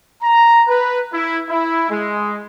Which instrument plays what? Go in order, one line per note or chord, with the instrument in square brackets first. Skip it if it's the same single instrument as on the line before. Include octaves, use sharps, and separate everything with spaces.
[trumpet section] A#5
B4
E4
E4
G#3